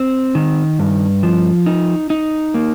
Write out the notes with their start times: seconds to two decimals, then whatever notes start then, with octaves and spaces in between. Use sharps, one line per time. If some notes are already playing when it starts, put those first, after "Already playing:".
Already playing: C4
0.35 D#3
0.79 G2
1.23 F3
1.66 D#4
2.10 D#4
2.54 A#3